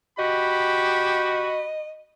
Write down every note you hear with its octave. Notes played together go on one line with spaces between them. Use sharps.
F#4 G4 D#5 B5